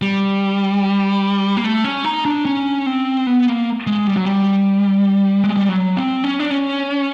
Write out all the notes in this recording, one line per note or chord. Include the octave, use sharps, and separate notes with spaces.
G3
A#3
A3
C#4
D#4
D4
C#4
C4
B3
A#3
G#3
G3
F#3
G3
G#3
G3
F#3
C4
C#4
D4
C#4